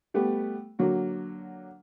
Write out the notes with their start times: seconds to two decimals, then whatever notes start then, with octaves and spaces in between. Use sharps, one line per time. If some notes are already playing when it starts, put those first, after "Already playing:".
0.14 G3 A3 B3 G4
0.79 D3 F#3 A#3 F#4